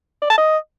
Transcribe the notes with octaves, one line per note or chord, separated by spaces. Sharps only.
D5
A5
D#5